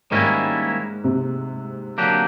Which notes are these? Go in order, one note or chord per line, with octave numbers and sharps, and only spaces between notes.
G#2 D#3 G3 A#3 C#4 E4
C3
D3 F#3 A#3 D4 G4